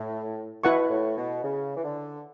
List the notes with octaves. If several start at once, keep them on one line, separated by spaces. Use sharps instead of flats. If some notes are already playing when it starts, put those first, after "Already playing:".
Already playing: A2
B2 E4 B4 F#5 C#6
A2
B2
C#3
E3
D3